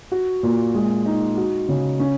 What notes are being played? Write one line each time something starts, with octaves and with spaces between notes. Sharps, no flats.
F#4
A#2
G#3
D#4
F#4
C#3
C#4